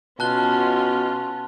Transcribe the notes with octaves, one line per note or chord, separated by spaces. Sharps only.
B2 C#4 F4 A5 F#6 G7